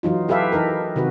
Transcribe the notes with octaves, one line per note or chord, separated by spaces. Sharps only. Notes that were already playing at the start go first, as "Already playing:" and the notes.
E3 F#3 D#4 F4
E4 G4 A4 B4 E5 F5
E3 D#4 A4 A#4
C3 D#3 F#4 B4